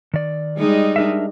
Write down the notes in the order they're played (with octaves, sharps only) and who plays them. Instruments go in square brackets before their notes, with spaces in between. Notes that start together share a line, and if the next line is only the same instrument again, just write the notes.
[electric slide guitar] D#3 D5
[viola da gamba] G3 G#3 D#4
[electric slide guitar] D4 A#4 E5